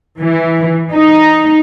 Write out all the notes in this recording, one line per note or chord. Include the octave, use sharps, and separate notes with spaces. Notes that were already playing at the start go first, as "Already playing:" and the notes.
E3
D#4